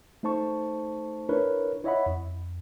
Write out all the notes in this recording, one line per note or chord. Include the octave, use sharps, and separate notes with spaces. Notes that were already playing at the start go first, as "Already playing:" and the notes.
A3 D#4 C5 A5 C#6
D4 E4 A#4 B4 C#5
E4 C#5 D#5 E5 F#5 B5
F2